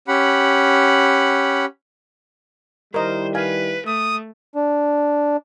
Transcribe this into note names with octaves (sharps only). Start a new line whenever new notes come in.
C#4 G4 F#5 B5
D#3 G3 E4 A#4 C5 D#5
B4 F5 G#5
A3 D#6
D4